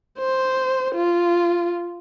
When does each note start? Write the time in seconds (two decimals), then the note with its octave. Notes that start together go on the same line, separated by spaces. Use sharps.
0.18 C5
0.94 F4